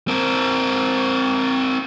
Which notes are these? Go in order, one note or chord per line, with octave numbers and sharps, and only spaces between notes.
C4 A#4